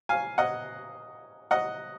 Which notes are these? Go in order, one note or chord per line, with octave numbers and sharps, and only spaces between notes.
F5 G#5
D#5 F#5
D#5 F#5